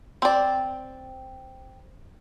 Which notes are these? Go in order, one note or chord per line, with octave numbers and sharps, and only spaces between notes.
C4 D5